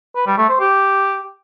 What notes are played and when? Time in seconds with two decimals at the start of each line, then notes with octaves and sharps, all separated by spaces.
0.15 B4
0.27 G3
0.38 A3
0.49 C5
0.60 G4